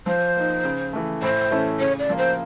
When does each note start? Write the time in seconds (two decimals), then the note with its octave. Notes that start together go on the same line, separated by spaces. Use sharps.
0.06 F3 C5
0.36 A#3 D#4
0.64 C#3
0.93 E3 A3
1.22 A2 C5
1.51 E3 A3 C#4 E4
1.79 C#3 C#5
1.99 D5
2.09 F3 A#3
2.18 C5